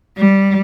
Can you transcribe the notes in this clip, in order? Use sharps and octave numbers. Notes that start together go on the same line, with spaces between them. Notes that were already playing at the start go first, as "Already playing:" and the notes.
G3